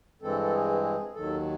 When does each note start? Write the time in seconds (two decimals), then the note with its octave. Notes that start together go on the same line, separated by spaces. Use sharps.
0.22 G2 E3 G#3 C4 A4
0.41 A4
0.53 G#4
0.83 G#4
1.14 D#2 D#3 F#3 A4